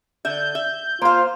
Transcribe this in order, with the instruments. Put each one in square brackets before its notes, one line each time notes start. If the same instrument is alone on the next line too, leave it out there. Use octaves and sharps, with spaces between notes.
[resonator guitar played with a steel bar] D3 E5 [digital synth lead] G6
[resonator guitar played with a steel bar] E5
[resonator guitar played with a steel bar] A#3 F5 [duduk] F4 [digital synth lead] C5